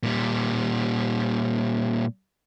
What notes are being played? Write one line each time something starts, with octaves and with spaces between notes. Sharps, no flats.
A#2 G3